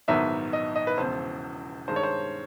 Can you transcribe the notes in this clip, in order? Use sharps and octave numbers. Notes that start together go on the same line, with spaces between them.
A#1 G#2 D#3 F#3 B3 E5
D#5
D#5
B4
E1 E2 C#3 F3 C5
G2 D#3 G#3 C5
C#5
C5